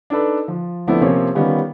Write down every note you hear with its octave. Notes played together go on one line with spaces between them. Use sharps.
D4 D#4 A4 B4
F3
F3 A3 B3 C4 D4 E4
C3 F3 A#3 C4 C#4 C#5
D#3 G3 B3 C#4 F4